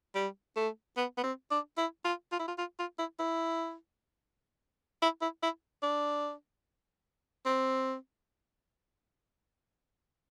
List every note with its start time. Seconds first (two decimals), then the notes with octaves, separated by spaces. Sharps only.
0.15 G3
0.56 A3
0.97 B3
1.18 B3
1.24 C4
1.51 D4
1.78 E4
2.05 F4
2.32 F4
2.40 E4
2.48 F4
2.58 F4
2.79 F4
2.99 E4
3.19 E4
5.02 E4
5.22 E4
5.43 E4
5.83 D4
7.46 C4